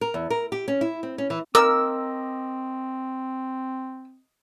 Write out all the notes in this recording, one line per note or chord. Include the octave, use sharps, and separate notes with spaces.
A#4
E2
A#4
G4
C#4
E4
C4
C#4
E3
C4 A#4 D#5 D6 E6